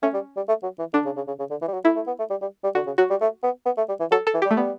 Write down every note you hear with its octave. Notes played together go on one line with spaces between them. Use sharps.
A3 C#4
G3
G3
A3
F#3
E3
D3 D4
C#3
C#3
C#3
C#3
D3
E3
G3
F#3
A3 E4
A3
B3
A3
G3
G3
G3
D3 F#4
C#3
F#3 F#4
G3
A3
B3
B3
A3
G3
E3
F#3 A4
A4
E3
G3 G4
A3
G3 B3